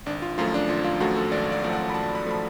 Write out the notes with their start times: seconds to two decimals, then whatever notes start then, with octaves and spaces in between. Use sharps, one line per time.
0.06 G#1 D4
0.22 F4
0.38 F#2 F3 A3 F4
0.54 D4
0.69 G#1 F4
0.84 F4
1.00 F#2 F3 A3 F#4
1.16 A4
1.32 G#1 D5
1.52 D5
1.63 F#2 F3 A3
1.73 F#5
1.90 B5
1.94 G#1 A5
2.15 B5
2.26 F3 A3 B5